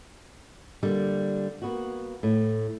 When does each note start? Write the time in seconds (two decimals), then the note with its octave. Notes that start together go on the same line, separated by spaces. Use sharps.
0.83 D3 G3 A#3
1.62 A#3 B3 F#4
2.23 A2